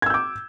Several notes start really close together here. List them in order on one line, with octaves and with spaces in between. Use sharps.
G#6 E6 G6 D6